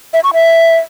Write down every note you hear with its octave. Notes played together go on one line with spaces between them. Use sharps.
E5
C#6
E5